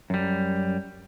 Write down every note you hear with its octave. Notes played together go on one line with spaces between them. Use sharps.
F#2 G3